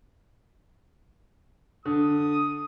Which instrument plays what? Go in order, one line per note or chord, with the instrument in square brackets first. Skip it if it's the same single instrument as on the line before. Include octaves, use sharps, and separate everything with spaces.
[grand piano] D3 [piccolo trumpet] D#6